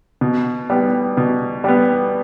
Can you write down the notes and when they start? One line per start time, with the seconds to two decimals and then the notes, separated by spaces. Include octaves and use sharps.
0.21 B2
0.70 G3 B3
1.17 B2
1.64 G3 B3